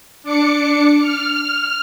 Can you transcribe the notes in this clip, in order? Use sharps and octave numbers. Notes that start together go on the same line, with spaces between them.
D4 D6 C#7
F6